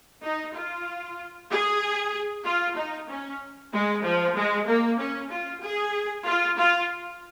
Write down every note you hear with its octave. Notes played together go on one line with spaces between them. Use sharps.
D#4
F4
G#4
F4
D#4
C#4
G#3
F3
G#3
A#3
C#4
F4
G#4
F4
F4